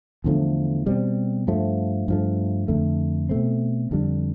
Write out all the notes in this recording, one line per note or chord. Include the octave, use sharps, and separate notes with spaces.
E2 D3 F3 A3
B2 G3 C4
G2 F3 A3
G2 F3 A3
F2 D3 A3
B2 A3 C4
F2 D3 G3 D4